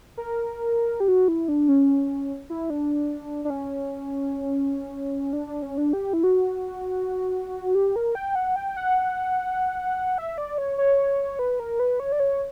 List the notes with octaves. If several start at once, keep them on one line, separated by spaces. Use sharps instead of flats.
A#4
G4
F#4
E4
D4
C#4
E4
D4
D4
C#4
D4
D4
C#4
D4
G4
E4
F#4
G4
A#4
G5
F#5
G5
F#5
E5
D5
C#5
C#5
B4
A#4
B4
C#5
D5
C#5